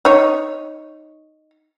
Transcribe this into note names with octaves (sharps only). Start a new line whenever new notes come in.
D#4 C#5